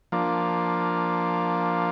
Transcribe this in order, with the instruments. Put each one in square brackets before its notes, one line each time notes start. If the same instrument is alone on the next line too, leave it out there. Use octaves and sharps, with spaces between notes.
[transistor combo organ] F3 A#3 D4